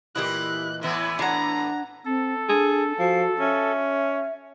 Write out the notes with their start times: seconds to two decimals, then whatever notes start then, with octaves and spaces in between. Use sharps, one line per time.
0.16 A#2 E3 E4 G4 D#5 F#6
0.83 A2 E3 B3 E5
1.19 D4 F#5 A#5
2.05 C4 A4
2.49 D4 G#4
2.99 F3 F#4
3.40 C#4 E5